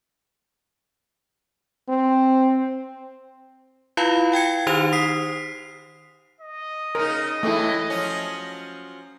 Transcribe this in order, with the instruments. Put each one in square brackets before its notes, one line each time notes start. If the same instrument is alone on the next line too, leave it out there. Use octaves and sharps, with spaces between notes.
[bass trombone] C4
[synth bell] E4 F4 B4 F5 B5
F5 G5 G#6 C#7
D#3 D#4 G4 C5 F7
D#6 B6 C7
[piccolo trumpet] D#5
[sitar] C#3 D#4 [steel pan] A#4
[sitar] A2 E3 G#3 [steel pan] A3 E4
[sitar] F3 F#3 C#4